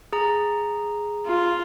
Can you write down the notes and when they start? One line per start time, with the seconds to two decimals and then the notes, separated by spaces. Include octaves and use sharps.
0.13 G#4 A#5
1.26 F4